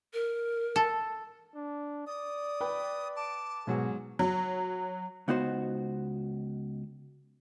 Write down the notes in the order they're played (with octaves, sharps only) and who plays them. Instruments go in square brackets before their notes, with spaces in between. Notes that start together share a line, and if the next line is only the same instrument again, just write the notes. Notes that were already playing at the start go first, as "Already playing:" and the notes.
[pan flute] A#4
[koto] A4
[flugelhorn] D4
[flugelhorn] D5 [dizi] D#6
[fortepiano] B4 G5 B5
[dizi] A5 [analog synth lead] D6
[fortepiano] G#2 F#3 [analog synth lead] B2 [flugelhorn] G#4
[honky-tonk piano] F#3
[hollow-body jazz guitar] C#2 B3 D#4 F#4 C5